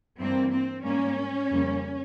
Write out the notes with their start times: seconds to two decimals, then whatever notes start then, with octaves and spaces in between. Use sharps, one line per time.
0.20 G2 E3 A#3 C4
0.52 C4
0.84 G#2 G3 A#3 C#4
1.49 F2 C#3 G3 A#3